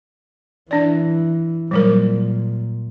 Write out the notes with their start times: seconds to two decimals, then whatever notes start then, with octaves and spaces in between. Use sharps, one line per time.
0.71 E3 D4 D5
1.71 A#2 F#3 G3 A#4